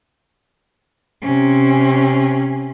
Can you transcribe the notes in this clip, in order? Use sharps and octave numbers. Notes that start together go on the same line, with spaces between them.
C3 C#4